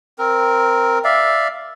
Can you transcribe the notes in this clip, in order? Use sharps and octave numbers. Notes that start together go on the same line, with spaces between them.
C4 A#4
D5 E5 F5